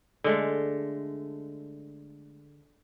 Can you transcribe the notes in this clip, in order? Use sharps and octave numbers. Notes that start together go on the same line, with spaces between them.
D3 G#3 A3